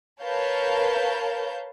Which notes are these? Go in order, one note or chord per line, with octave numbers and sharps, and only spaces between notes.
A#4 B4 C#5 F5 A5 G6